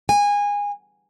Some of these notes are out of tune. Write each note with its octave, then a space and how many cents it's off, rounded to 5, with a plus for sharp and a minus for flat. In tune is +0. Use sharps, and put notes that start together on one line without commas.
G#5 -20